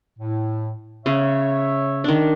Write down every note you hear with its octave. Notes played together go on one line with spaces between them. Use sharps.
A2
C#3 C#5 E5
D#3 D4